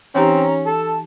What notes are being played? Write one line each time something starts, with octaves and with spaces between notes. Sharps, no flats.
E3 C4 C#4 D#4 G4 A#5
A4 A5